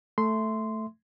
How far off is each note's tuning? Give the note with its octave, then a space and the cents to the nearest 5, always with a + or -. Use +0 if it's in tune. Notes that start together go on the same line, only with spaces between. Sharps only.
A3 +0 E5 +0 C6 -10